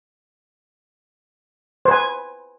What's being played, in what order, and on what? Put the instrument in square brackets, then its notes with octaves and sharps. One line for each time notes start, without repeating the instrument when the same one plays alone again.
[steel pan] C5
B4
G#5